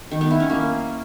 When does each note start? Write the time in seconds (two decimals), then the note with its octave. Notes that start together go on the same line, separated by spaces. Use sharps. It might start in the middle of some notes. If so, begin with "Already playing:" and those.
0.11 D#3
0.21 B3
0.31 E4
0.40 C#4
0.50 A#3